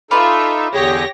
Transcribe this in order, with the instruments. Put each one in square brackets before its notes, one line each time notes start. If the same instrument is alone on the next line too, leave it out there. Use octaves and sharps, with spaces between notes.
[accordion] D#4 A4 [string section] F4 E5 [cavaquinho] B4 D5 F5
[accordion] E2 D3 G#4 [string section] G4 C#5 A#6